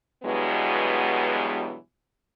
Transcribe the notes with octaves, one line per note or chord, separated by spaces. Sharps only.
G2 B2 E3 F#3 G#3 B3